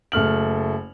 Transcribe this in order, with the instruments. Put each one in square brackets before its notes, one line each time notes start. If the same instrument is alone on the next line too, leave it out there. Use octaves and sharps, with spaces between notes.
[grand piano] F#1 A3 F6 F#7